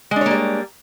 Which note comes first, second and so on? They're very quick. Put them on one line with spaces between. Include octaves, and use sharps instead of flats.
G#3 D4 C#5 A#3 G3